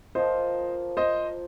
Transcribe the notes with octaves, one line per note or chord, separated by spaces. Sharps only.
F3 A#3 F4 C5 D#5
C5 D#5